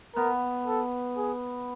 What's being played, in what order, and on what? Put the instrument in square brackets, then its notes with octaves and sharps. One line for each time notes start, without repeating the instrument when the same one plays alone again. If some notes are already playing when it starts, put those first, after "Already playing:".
[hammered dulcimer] B3 [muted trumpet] A#4
[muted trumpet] A4
G#4